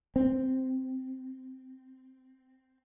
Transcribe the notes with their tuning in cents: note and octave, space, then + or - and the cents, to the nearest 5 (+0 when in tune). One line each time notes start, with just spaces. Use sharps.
C4 -5